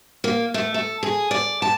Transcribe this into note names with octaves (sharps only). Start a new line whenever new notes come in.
A#3
A3
A4
G#4
D5
A5